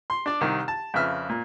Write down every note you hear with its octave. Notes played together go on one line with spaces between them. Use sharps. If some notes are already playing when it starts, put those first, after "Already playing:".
C6
D4 D5
C2 D#3
A5
F2 C#3 B4 E5 F6
A#2